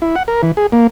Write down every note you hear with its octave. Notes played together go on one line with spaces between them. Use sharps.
E4
F#5
A#4
E3
G#4
A#3